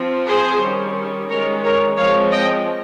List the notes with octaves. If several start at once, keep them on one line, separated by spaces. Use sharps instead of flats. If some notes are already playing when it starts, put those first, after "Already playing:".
Already playing: F3 C4
G#4 C5
D#3 G3 C#4
D#3 G#3 C#4 A#4 C#5
A#4 C#5
F3 G#3 C4 C#5 F5
D#5 G5